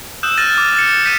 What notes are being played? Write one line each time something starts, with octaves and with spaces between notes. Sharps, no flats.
D#6 E6 F#6 G6 E7
F6 A6 A#6 D#7
D6
A6 C#7
G6 B6 D#7